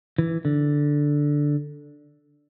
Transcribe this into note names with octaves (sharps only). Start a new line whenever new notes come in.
E3
D3